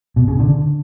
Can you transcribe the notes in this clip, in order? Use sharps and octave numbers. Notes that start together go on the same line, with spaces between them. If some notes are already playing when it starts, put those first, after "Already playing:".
B2
C#3
D3